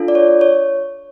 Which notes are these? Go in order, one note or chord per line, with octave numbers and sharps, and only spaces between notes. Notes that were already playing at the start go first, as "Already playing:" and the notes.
Already playing: D4 F4 A4
D5
C#5
C#5